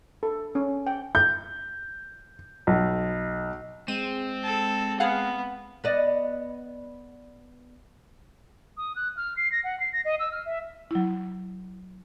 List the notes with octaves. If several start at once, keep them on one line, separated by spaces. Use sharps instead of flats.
A4
C#4
G5
G6
B1
G#3 C4 D#7 E7
A4
B3 G#4 F5 F#5
B3 D5 D#5
D#6
F#6
F6
C7
A#6
F#5
C7
A#6
D#5
E6
F6
E5
F#3 E4